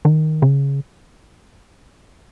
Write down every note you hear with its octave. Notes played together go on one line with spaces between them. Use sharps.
D#3
C#3